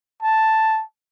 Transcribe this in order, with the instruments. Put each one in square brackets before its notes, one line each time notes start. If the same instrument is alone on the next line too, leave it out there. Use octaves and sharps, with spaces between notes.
[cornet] A5